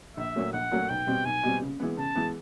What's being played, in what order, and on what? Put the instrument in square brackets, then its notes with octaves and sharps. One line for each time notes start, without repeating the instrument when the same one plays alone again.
[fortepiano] A#1 [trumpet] E5
[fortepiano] A#2 F#3 A3 C#4
[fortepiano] A#1 [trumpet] F#5
[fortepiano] A#2 F#3 A3 C#4
[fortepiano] B1 [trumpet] G5
[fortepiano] B2 G3 C4
[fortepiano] B1 [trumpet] G#5
[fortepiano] B2 G3 C4
C#3
E3 G#3 B3
[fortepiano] C#3 [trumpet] A5
[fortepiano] E3 G#3 B3